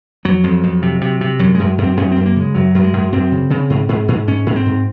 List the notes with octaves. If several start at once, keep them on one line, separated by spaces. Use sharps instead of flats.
F2 F#3
F2
F2
C3
C3
C3
F#2 F#3
F#2 G#3
F#2
C4
F#2 C#4
F#2 C4
A#3
C#3 G#3
F#2 F#3
F#2
G#3
F#2
F#2 C4
C#3
C#3
G#2
G#2
G#2
G#2 C#4
G#2
C4
G#2